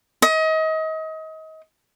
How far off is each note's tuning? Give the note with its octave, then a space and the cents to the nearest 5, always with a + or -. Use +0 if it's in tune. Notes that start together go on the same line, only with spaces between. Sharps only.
D#5 +30